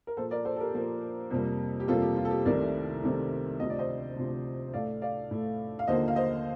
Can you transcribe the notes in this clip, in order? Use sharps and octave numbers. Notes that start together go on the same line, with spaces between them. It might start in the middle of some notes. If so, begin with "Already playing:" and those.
A#4
A#2 F3 A#3 A4 C5
A#4 D5
A4 C5
A4
G4 A#4
A#2 F3 A#3
F2 C3 G3 A#3
G4
F2 C3 G3 A#3 F4 A4
G4
F4
A4
G4
C2 C3 D#3 A3 A#4 D5
C2 C3 D#3 A3
D2 C3 F3 D#5
D5
C5 D#5
D2 C3 F3
A2 A3 D5 F5
D5 F5
A2 A3
F5
D#2 D3 F3 A#3 C5 D#5
F5
C5 D#5